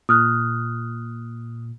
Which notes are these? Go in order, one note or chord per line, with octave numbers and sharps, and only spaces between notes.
A#2 D#6 F6 F#6